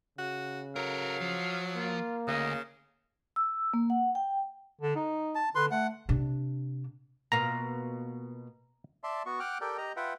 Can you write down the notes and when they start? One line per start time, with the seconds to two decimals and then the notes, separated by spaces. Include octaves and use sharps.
0.19 C#3 F#4
0.76 F#3 A4 A#4 F5
1.21 F3
1.76 A#3 F4
2.28 D2 C#3 D#5
3.36 E6
3.74 A#3
3.90 F#5
4.15 G5
4.82 D3
4.96 D#4
5.35 A5
5.55 D3 B4 C6
5.71 A3 F#5
6.09 C3 D4
7.32 B2 A#3 F4 A#5
9.04 D5 E5 A5 C6
9.26 B3 F#4 C#6
9.40 F#5 G5 D6 F6 F#6
9.61 G4 A4 A#4 D5 G5
9.78 G4 D#5 A#5
9.96 F4 B4 E5 F#5 G5